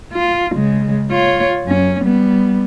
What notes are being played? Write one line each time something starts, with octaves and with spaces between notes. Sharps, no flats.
F4
C#3 G#3
F4 C#5
F#2 C#4
G3 B3